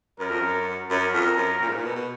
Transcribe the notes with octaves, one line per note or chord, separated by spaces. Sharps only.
F#2 A#4
F2
F#2
F#2 A#4
F2
F#2
A#2
G#2
A#2
B2
B2